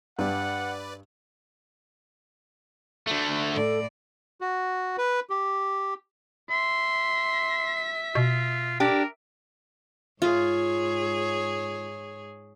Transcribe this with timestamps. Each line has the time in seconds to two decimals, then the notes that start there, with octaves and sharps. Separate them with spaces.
0.19 G2 B4 D5 F#5
3.07 D3 A3
3.52 A2 A4 D5
4.41 F#4
4.98 B4
5.30 G4
6.50 E5 C6 B6
8.15 B2 F4
8.80 D4 G4 A#4
10.22 G#2 F4 G#4 C#5